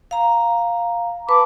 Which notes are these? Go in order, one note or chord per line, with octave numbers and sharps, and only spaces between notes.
F5 A#5
B4 A5 B5 D6